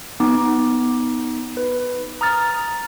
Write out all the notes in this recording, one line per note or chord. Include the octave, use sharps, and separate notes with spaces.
B3 D#4 D6
B4
A#5 D#6 F6 A6